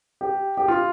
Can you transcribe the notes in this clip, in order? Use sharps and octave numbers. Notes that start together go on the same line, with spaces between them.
G4
G4
F4